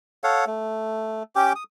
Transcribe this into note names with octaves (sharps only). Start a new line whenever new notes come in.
A4 C#5 F5 F#5
A3
C#4 G4 G5 D6
D#6